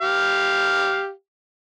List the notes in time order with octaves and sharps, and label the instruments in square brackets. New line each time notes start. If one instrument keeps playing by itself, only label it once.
[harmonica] G4 F5